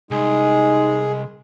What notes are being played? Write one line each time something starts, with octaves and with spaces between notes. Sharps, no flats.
C2 G#3 D#4 G#4